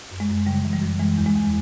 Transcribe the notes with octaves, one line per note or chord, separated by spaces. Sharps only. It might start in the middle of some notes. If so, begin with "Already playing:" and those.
F#2
G#3
F#2
C#3 G3
E3
G3
F#2
E3 G#3
E2
G#3
E2